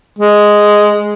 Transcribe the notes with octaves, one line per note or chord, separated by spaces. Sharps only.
G#3